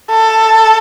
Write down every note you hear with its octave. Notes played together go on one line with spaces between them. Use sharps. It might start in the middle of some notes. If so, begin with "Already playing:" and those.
A4